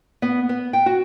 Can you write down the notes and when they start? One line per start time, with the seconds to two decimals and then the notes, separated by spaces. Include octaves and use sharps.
0.22 B3
0.49 B3
0.73 G5
0.86 F#4